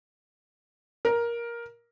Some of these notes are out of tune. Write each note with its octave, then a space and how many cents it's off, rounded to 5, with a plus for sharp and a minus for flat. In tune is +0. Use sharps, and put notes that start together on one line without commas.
A#4 +10